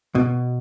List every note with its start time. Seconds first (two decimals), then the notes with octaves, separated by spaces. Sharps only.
0.15 B2